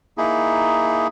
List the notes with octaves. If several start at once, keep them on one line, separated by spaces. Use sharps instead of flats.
A#3 D#4 E4 G#4